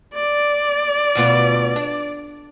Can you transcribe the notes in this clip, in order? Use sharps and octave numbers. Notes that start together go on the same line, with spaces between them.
D5
D2 B2 F4
D4